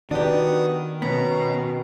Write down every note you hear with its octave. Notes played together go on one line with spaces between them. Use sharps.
D#3 B3 D4 F#4 G4 D#6
B2 B3 C#4 A#5